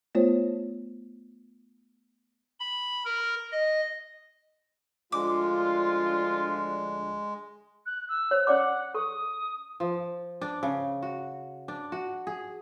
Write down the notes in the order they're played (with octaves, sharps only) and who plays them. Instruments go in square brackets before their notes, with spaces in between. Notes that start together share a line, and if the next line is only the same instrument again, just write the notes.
[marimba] A3 B3 F4 C5 C#5
[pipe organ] B5
A#4
D#5
[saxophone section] D2 F3 D4 [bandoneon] G#3 [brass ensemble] F4 [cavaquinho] D6
[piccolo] F#6
E6
[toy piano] C5 C#5
[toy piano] C#4 D5 D6 [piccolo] F#5
[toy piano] A4 C#6 [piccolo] D#6
[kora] F3
D4
C#3
F#4
D4
F#4
G#4